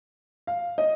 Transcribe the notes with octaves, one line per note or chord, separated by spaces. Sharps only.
F5
D#5